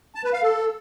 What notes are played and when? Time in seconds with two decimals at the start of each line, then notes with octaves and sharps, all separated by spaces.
0.15 A5
0.24 B4
0.33 F5
0.42 A4